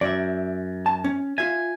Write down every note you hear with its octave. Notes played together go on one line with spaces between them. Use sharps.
F#2 D5 E5
A5
C#4
F4 E5 G#5